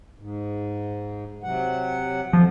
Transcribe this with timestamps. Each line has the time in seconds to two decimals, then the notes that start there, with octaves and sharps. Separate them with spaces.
0.19 G#2
1.43 C3 F#3 F#5
2.33 F2 F3